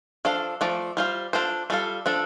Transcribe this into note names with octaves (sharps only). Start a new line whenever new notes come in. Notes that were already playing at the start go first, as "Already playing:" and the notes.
F3 D4 A4 F5
F3 A3 D5
G3 F4 C5 F5
D4 F4 A4 C5
G3 F4 A4 F5
F3 D4 A4